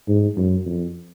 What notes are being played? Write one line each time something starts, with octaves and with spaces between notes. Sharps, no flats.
G#2
F#2
F2